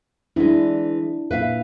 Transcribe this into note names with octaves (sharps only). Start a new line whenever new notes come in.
E3 G#3 D4 E4
A#2 B4 E5 F5